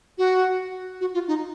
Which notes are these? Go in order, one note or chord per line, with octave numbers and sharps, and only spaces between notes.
F#4
F#4
F4
D#4